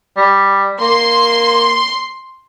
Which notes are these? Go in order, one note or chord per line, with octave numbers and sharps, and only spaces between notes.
G3
A#3 C6